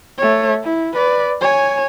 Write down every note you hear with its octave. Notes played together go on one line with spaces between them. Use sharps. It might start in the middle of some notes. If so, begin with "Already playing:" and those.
A3 C#5
E4
B4 D5
C#5 G#5